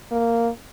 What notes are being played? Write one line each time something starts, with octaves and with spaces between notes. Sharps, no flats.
A#3